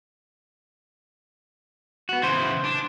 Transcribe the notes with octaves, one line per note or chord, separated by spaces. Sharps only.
B3 F#4
C#3 E3 C5
D4